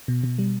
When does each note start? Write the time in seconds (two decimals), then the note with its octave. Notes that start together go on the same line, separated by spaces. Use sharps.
0.08 B2
0.24 B2
0.39 G3